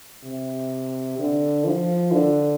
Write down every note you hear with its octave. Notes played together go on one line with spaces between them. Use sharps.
C3
D3
F3
D3